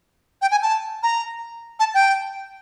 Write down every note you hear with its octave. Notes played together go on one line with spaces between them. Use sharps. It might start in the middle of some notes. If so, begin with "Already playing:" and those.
G5
G#5
A5
A#5
A5
G5